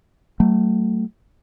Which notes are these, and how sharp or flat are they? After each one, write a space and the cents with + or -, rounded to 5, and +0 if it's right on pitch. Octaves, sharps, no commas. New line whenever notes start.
F#3 +45 A3 +25